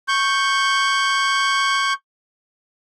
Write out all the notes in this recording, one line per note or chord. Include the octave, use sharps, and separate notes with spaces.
C#6 G6